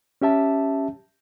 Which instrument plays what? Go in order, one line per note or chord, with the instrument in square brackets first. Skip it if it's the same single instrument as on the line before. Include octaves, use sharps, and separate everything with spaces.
[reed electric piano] C#4 G4 E5 A5